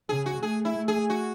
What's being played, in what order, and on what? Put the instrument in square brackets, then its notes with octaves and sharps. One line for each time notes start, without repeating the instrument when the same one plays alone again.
[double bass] C#3 [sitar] G#4
[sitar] F#4
[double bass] A3 [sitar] G#4
[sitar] E4
[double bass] A3
[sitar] G#4
F#4